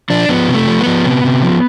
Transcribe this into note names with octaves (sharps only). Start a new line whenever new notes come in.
F3 D4
F3 B3
C3
A3
F3
B3
F3
C3
C3
F3